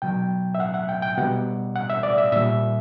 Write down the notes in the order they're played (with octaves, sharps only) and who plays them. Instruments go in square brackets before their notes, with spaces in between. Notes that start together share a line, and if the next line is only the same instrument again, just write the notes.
[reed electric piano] B2 F#3 G5
E5
F#5
F#5
G5
G5
B2 G3 F#5
F#5
E5
D5
E5
A#2 G3 E5